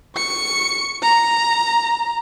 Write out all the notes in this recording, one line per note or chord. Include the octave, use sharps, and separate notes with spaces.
C#6 C#7
A#5